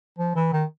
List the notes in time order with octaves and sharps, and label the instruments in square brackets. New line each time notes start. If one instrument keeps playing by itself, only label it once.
[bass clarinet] F3
E3
D#3